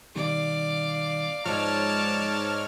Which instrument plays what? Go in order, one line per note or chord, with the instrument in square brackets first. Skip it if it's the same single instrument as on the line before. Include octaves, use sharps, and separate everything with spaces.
[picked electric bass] B2 D#3 G3 [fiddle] D5 F5
[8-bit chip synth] G#2 C#5 F6 [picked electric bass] F3 [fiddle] D5 [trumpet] A5